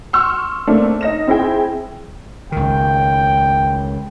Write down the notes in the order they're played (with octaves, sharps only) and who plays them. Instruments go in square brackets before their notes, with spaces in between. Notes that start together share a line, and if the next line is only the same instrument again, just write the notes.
[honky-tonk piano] C6 C#6 E6 F6
A3 A#3 C4 D4
D#4 A#6 E7
C4 E4 G#4 G5
[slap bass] C#2 D#3 [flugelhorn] G5